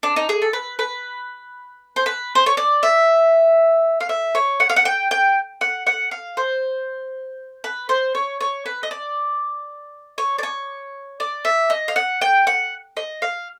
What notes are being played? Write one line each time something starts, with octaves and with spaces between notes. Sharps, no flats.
D4
D#4
G#4
A4
B4
B4
C5
B4
C5
C#5
D5
E5
F5
E5
C#5
F#5
F5
F#5
G5
G5
F#5
F#5
F5
C5
B4
C5
C#5
C#5
B4
D#5
D5
C#5
D5
C#5
D5
E5
D#5
F5
F#5
G5
F#5
D#5
F5